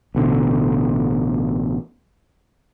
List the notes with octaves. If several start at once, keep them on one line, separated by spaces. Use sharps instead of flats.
A1 B2 D3